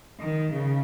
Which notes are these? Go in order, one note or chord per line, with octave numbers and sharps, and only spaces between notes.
D#3
C#3